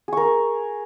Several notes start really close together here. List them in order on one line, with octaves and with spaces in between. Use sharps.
G#4 C#6 A#4